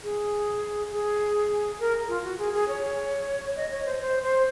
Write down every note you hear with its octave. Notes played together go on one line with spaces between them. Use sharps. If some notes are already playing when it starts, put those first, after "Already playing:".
G#4
G#4
A#4
F4
F#4
G#4
G#4
C#5
D#5
C#5
C5
C5
C5